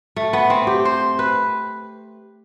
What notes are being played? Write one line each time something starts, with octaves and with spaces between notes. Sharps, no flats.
A3
B3
C4
G4
C5
B4